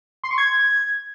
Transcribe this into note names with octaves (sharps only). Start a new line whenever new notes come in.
C6
C#6
G#6